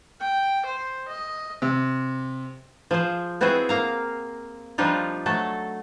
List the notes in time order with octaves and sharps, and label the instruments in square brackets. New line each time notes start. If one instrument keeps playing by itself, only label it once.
[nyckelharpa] G5
C5
D#5
[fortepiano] C3
[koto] F3 G#4 C5
B3 C4 E4 F#4 G#4 C5
A#3 F5 A#5
F3 G3 D4 D#4 F4
F#3 A3 A4